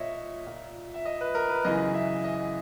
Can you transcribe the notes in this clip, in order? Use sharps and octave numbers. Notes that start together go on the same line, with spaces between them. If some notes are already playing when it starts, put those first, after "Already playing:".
Already playing: A#2 C#5 D#5 E5
A#2
E5
D#5
B4
A#4
B4
F#2 C#3 E3 D#5
E5
D#5